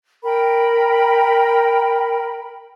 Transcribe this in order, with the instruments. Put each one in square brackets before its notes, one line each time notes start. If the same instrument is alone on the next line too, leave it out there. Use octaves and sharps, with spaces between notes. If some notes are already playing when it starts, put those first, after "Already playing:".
[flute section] A#4 G5 B5